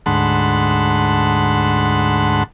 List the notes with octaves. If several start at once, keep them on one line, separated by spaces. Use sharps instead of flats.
D2 G#2 F#5 A5 B5 C6